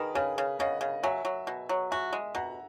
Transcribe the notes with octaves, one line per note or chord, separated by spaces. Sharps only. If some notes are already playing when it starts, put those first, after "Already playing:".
Already playing: D#3 G#4 A#4 B4
C#3 G#4 B4
C#3
C#3 D#5 F#5
C#3
F#3 E5 G#5
F#3
B2
F#3
F#4 E5 G#5
G#3
B2 F#5 A#5